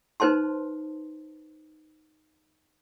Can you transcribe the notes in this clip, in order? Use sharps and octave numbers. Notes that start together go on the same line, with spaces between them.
D#4 B4 C5 A5 C6